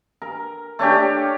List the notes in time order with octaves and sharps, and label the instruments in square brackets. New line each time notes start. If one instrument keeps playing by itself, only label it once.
[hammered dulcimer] A#4
A3 C#4 D4 G4